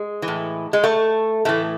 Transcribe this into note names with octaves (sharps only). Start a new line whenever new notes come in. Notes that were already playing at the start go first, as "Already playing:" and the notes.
Already playing: G#3
E3
A2
G#3
A3
A2 E3 A3